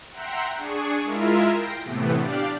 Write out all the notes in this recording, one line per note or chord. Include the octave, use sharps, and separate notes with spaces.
E5 F#5 G5 A#5 C6
D4 G#4 C#6
G#3 E4 F4 A#4 E5
G5 A#6 C7 D7
A2 C3 E3 A3 B3
D4 G4 D5 F5